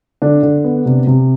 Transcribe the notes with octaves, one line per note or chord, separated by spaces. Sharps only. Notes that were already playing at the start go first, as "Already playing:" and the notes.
D3 D4
D3
B3
C3
C3